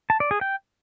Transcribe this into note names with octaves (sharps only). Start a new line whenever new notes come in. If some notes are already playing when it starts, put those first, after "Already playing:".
A5
D5
G#4
G5